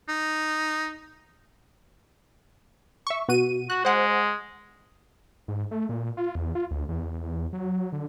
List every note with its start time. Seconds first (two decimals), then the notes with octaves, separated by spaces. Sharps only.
0.09 D#4
3.07 E5 C#6
3.28 B2 F#4 D#7
3.70 F#4 F#6
3.85 G#3 C5 F#5
5.48 G#2
5.71 A3
5.89 A#2
6.17 F4
6.35 E2
6.55 F4
6.71 D2
6.89 E2
7.23 E2
7.53 F#3
7.92 D3